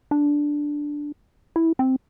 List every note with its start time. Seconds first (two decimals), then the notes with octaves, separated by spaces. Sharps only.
0.11 D4
1.56 E4
1.79 C4